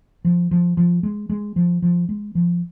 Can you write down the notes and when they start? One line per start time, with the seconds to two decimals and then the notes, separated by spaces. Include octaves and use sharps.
0.25 F3
0.51 F3
0.77 F3
1.03 G#3
1.29 G#3
1.56 F3
1.82 F3
2.09 G#3
2.35 F3